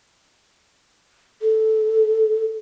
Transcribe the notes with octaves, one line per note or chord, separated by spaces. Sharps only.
A4